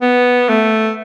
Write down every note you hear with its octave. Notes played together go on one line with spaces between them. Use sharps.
B3
A3